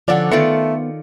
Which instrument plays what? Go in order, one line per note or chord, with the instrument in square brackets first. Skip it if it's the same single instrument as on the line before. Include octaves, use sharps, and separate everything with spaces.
[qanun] D3 C#4 A4 [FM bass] F3 [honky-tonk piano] D5 F#5
[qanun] D#3 F4 D5 [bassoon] A3 [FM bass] B3 [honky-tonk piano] C#7